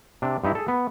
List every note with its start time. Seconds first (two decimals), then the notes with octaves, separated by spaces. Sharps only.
0.22 C3 D4
0.44 G2 D#4 E4
0.55 G#4 A4
0.68 B3